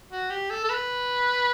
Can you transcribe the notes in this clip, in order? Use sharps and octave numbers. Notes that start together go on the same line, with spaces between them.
F#4
G4
A4
A4
B4